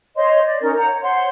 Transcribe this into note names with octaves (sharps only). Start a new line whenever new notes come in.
C5 C#5 D#5 C6
D5
C#4 D#4 A#4
F#5 A#5 G6
C#5
C5 C#5 F#5 C6